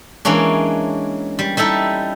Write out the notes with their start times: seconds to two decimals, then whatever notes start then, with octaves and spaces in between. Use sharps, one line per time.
0.25 E3 G#3 A#3 C#4 D4
1.39 G3
1.57 G3 D#4 E4 A4